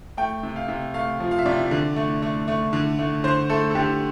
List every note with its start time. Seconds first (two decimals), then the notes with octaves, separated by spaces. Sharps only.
0.17 A3 G5
0.43 C3
0.56 F5
0.68 C3
0.94 A3 F5
1.20 F3
1.31 F5
1.39 E5
1.46 C3 D5
1.71 D3
1.96 A3
2.22 A3
2.48 A3
2.73 D3
2.99 A3
3.24 D3 C5
3.50 A3 A4
3.71 A4
3.75 D3 G4